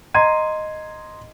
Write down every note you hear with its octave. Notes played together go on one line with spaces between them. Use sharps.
D#5 A#5 C6 G#6 D#7